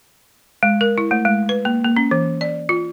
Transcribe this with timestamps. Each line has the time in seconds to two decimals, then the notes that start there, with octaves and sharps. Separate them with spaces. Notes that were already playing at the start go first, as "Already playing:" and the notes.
0.63 G#3
0.81 A#4
0.98 E4
1.11 A3
1.25 G#3
1.49 B4
1.65 A#3
1.84 A#3
1.97 C#4
2.11 E3
2.41 D5
2.69 F4